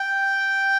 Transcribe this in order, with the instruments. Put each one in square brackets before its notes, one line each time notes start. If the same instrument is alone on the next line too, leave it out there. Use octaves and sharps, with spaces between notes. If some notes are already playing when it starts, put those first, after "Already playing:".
Already playing: [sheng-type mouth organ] G5